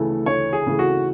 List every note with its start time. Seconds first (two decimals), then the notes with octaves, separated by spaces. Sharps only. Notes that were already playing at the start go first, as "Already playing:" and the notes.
Already playing: D2 C#3 E3 A3 A4
0.26 D2 C#5
0.53 G#4
0.66 C#3 E3 A3
0.79 F#4